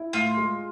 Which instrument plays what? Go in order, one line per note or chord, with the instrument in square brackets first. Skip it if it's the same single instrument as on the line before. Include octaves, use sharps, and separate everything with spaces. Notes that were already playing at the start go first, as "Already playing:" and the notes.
Already playing: [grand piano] E4
[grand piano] A2 [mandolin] F4
[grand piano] G#3